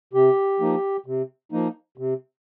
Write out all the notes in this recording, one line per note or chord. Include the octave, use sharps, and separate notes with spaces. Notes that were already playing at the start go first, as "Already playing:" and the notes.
C3 G4
F3 A#3 D#4
C3
F3 A#3 D#4
C3